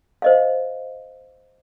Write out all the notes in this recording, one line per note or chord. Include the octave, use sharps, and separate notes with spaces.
C5 D#5 F5